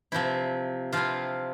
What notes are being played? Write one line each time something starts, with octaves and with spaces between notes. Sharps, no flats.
C3 F3 C4 E4
C3 F3 C4 E4 F4 F5